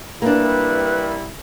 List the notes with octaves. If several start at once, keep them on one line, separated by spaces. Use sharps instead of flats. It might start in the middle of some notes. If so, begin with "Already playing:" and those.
C2 G3 A#3 D4 E4 B4